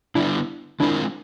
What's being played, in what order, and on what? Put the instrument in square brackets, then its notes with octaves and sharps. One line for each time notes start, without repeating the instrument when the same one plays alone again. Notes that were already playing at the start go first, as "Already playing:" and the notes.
[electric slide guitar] D3 G3 B3 [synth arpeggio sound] D4 E4
[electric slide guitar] D#3 G#3 C4 F4 A#4 [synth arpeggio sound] D4 E4